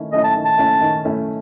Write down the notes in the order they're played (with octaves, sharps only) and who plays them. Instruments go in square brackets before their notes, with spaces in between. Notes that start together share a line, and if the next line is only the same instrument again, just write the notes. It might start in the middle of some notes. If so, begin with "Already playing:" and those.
Already playing: [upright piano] D#3 A3 C#4 E4
[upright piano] A3 C#4 E4 [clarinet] D#5
[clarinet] A5
[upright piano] D#3
[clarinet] A5
[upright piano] A3 C#4 E4
D#3
A3 C#4 E4